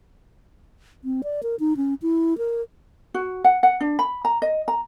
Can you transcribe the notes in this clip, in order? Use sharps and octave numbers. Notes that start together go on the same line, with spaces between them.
C4
D5
A#4
D#4
C#4
E4
A#4
F#4
F#5
F#5
D4
B5
A#5
D#5
A#5